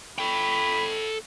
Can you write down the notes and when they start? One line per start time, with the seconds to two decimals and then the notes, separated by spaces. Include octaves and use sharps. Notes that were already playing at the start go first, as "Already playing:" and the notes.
0.19 A4 G5 B5